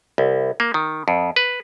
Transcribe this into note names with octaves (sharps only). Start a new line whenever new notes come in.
C2
A#3
D#3
F2
B4